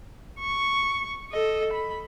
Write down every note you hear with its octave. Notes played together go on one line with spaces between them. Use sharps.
C#6
A4 D#5
B5